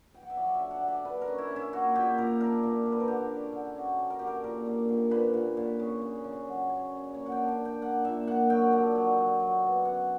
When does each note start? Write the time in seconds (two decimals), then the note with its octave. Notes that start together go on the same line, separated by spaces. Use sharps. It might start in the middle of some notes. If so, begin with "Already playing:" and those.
0.14 G5
0.23 F#5
0.30 E5
0.37 F#3 D5
0.54 E5
0.60 D3
0.71 F#5
0.83 D3
0.88 D5
1.05 D3 B4
1.22 A#4
1.28 C#4
1.38 E4
1.50 C#4
1.56 E4
1.73 A#3 F#4
1.95 A#2 G4
2.18 A#2 A#4
2.40 D4 A#4
2.63 A#2
2.85 D4
2.92 B4
3.00 A#4
3.08 D3 G4
3.31 C#4
3.53 D3
3.76 C#4 F#4
3.99 C#4
4.10 A#4
4.19 D3 G4
4.27 A#4
4.44 A#2 A#4
4.66 A#3
4.89 A#2
5.11 A#2 B4
5.34 A#2
5.57 A#2
5.79 C#3
6.02 C#3
6.24 C#3
6.47 F#3
6.69 C#4
6.92 C#3
7.14 A#3 C#5
7.26 F#5
7.32 G5
7.37 D4
7.49 G5
7.60 D4
7.65 G5
7.82 A#3 F#5
8.05 A#2 E5
8.27 A#2 F#5
8.50 F#3 G5
8.73 D3
8.95 F#3
9.18 F#3
9.40 F#3
9.63 B3
9.85 C#4 F#5